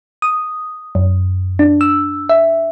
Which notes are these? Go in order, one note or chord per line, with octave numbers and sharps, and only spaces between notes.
D#6
F#2
D4
E6
E5